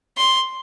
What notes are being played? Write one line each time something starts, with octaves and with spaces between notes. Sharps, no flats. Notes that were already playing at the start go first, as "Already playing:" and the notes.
C6